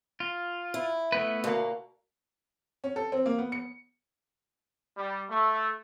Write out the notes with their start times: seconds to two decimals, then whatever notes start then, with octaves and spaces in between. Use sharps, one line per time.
0.20 F4
0.74 E4
1.12 A3 B3 B4
1.44 D2 B2 A#3
2.84 C#4
2.96 A4
3.12 C4
3.26 A#3
3.38 B3
3.52 C#7
4.97 G3
5.29 A3